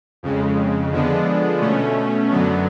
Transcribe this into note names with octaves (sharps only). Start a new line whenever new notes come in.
F2 C#3 G#3
D3 F3 G#3 B3 D4
B2 A3 C#4
F#2 D3 F#3 B3